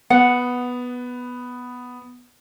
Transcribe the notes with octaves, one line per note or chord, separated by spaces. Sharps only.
B3 F#5